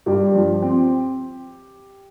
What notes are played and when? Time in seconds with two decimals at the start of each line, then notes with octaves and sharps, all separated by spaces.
0.06 G2 G4
0.34 F3
0.62 C4